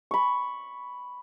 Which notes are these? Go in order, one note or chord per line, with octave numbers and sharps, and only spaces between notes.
B5 C#6